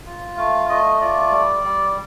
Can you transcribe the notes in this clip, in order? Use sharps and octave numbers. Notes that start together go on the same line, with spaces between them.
F4
A3 F5
A3 D#5
F4 D5
G3
G3